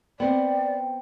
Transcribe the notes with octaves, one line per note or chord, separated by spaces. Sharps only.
B3 C4 D5 G5